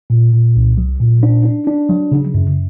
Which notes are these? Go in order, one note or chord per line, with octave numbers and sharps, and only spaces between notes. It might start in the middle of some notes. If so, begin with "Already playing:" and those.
A#2
A#2
C2
F#3
A#2
D4
D4
D4
F#3
C#3
F#2